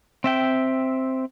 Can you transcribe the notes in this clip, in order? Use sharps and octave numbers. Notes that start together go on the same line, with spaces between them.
C4 E5 G5